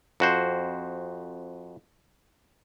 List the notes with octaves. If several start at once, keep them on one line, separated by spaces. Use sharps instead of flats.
F2 F#4 C5